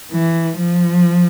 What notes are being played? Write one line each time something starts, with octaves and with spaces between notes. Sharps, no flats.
E3
F3